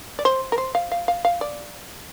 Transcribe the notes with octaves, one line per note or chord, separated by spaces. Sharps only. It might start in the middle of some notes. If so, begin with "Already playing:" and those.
D5
C5
A#4
C5
F5
F5
F5
F5
D5